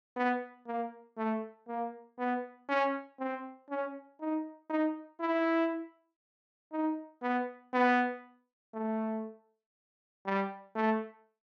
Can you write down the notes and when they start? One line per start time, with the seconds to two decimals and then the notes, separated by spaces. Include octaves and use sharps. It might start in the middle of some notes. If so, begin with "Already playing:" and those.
0.16 B3
0.67 A#3
1.17 A3
1.68 A#3
2.18 B3
2.69 C#4
3.19 C4
3.70 C#4
4.20 D#4
4.70 D#4
5.20 E4
6.72 D#4
7.22 B3
7.73 B3
8.74 A3
10.26 G3
10.75 A3